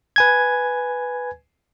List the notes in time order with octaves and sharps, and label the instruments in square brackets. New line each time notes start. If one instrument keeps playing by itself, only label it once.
[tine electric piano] B4 G#5 G#6